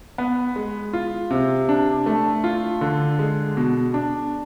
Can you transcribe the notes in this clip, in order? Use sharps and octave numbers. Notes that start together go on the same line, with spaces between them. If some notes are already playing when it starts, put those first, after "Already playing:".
B3
G#3
F4
C3
D4
A3
F4
D3
G#3
B2
D4